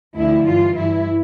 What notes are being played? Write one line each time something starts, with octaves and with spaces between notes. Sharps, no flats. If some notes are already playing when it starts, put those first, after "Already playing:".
D2 D3 F3 E4
G2 E3 F4
G2 E3 E4